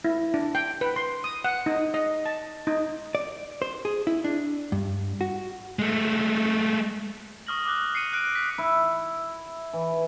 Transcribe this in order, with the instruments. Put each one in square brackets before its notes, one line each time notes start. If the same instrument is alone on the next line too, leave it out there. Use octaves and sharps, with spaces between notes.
[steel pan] E4
D4
G5
B4
C6
D#6
F#5
D#4
D#5
A5
D#4
[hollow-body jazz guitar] D5
C5
G#4
E4
D4
G2
F#4
[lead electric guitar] G#3 A3
[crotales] C#6 D#6 F6 A#6 F#7
D6 D#6 F6 F#6 G7
C7 C#7 D#7
F6 F#6 D7 D#7
F#6 B6
[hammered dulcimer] E4
E3